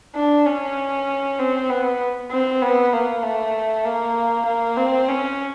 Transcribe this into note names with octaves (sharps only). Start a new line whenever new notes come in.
D4
C#4
C4
B3
C4
B3
A#3
A3
A#3
A#3
C4
C#4